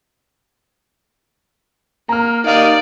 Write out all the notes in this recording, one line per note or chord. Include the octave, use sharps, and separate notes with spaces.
A#3 A#5 F6
A#3 D#4 D5 F5